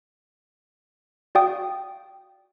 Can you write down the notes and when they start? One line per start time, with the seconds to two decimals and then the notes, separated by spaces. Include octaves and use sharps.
1.35 F#4 D5 F5 G5 D#6